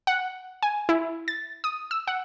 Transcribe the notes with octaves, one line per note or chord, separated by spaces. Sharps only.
F#5
G#5
E4
A6
D#6
E6
F#5